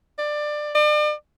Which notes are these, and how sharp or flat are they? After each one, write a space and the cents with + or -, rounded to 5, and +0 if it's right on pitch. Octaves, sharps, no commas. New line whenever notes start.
D5 +20
D5 +40